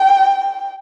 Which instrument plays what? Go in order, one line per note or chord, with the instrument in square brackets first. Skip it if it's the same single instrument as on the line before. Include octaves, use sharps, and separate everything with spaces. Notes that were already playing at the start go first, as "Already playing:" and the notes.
Already playing: [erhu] G5